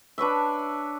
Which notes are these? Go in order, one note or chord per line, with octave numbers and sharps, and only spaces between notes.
D4 B4 C#5 E5